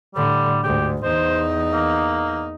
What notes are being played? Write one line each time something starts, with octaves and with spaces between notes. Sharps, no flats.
A2 D3 G3
D2 G#2 G4
E2 D#4 C5
A#3